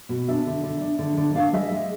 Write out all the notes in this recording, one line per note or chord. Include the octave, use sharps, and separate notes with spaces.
B2
D4 E5
D3
D3
D4
D3
D3
D4 F5
G#3 E5
G#3